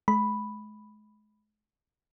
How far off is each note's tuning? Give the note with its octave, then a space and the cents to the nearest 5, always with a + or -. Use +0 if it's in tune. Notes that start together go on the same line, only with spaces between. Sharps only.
G#3 +40 B5 +0